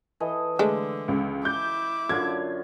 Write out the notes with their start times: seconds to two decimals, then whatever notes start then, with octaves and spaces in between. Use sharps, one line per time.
0.20 E3 A4 D#5
0.59 D3 G#3 A3 D4
1.08 C#2
1.45 E4 D6 G6
2.09 F#2 D3 F4 G#6